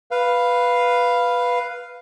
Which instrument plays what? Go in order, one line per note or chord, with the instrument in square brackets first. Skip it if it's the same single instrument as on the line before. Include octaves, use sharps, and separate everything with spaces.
[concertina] B4 F5